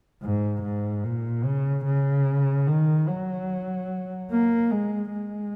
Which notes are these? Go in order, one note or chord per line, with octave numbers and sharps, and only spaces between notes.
G#2
G#2
A#2
C#3
C#3
D#3
F#3
A#3
G#3
G#3